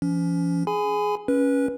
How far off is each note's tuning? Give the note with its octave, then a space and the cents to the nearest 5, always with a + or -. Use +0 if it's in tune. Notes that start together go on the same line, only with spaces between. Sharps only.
F3 -40 C#4 +30
G#4 +10 G#5 +0 B5 +35
C#4 +0 B4 -20